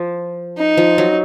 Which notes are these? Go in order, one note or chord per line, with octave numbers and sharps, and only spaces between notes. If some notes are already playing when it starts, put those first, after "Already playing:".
Already playing: F3
D#4
F3
F#3